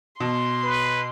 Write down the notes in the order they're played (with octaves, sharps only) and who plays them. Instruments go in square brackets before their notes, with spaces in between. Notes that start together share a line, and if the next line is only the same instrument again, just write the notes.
[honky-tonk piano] B2 A5 [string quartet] C6
[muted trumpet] B4